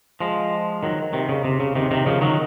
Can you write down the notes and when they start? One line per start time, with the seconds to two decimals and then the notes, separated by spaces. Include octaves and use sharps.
0.21 F3 G#3
0.83 D#3 F#3
1.13 C3 D#3
1.29 C#3
1.44 C3
1.60 C#3
1.75 C3 D#3
1.91 C3 D#3
2.06 C#3 F3
2.21 D#3 F#3